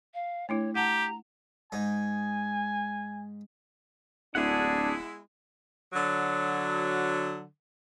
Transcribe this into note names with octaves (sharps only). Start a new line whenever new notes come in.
F5
A3 D4 E4 C#5
G4 F#5 A5 A#5
G#2 D#4 G#5
D1 G#3 B3 D4 E4 G#4 F#5
D3 F#3